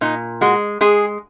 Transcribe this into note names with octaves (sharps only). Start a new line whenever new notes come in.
A#2 D#4
G#3 F#4
G#3 G#4